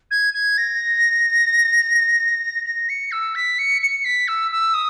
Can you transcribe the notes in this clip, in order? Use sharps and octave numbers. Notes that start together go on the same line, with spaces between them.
G#6
G#6
A#6
A#6
C#7
E6
B6
C#7
C#7
B6
E6
E6
D#6